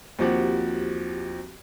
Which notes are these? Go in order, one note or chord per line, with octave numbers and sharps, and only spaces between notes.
D#2 F3 C4 F#4 G4 F#5